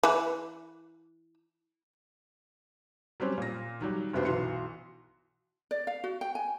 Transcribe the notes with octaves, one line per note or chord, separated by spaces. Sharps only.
E3 B4
F#3 G3 C4 C#4
A#2 A#6
D#3 F#3 G3
F#1 G2 C3 B3 F#4 C5
B1 E3 F#4 C6 C#7
D5
F5
F#4
G5
G#5